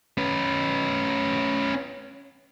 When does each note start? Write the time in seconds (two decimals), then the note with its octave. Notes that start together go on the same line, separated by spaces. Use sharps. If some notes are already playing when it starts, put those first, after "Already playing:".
0.18 C#4 B4